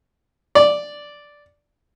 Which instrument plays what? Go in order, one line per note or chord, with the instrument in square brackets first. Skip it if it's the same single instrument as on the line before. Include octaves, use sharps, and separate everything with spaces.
[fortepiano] D5